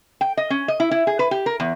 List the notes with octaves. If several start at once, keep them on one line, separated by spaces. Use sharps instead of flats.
G5
D#5
C#4
D#5
E4
E4
G#4
B4
G4
A#4
E2